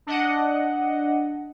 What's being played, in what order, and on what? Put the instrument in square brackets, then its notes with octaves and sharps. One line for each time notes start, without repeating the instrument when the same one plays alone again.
[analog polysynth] D4 D#5 F#5